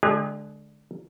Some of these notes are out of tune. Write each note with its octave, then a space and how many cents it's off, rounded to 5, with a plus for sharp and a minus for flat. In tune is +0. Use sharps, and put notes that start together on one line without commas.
D3 +0 G#3 +25 G#4 -45